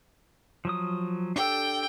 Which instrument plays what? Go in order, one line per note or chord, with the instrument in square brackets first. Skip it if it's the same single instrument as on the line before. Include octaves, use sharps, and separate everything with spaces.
[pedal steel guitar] F3 F#3 D#6
[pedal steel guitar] D4 G4 A4 [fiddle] G5